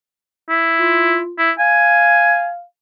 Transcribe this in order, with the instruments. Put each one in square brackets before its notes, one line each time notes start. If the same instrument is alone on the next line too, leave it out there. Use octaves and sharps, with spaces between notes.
[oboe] E4
[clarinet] F4
[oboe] E4
[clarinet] F5 [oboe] G#5